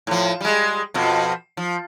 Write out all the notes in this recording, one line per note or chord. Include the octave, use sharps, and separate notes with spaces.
A2 F3
G3 G#3
F2 B2 F3
F3